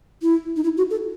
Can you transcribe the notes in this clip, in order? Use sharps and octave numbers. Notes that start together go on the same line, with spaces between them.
E4
D#4
E4
F#4
A4